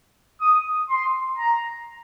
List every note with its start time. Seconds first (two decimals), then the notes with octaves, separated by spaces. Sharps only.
0.41 D#6
0.90 C6
1.38 A#5